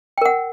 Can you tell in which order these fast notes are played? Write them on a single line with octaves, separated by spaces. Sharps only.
G5 A#4 F#5